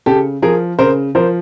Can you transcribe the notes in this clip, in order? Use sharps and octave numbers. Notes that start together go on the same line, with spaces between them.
C#3 G4 A4
F3 G#4 A#4
C#3 A#4 C5
F3 A#4 C5